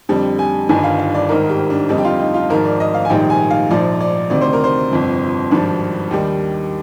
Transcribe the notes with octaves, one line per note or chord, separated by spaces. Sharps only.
F2 D3 G3
G#5
G1 G2 D#3 G3 G#5
F5
F5
D5
G#1 G#2 D#3 A#4
G4
D4
F2 D3 G3 D#4
G4
F4
D#4
F4
G#1 G#2 F3 A#4
D5
D#5
F5
G#5
A#1 G#2 D#3 G3 G5
G#5
F5
A#1 G#2 F3 D5
D5
D2 C3 D#3 D5
C5
A#4
C5
G1 F2 C3
G#1 G2 F3 D4
D#2 D#3 G3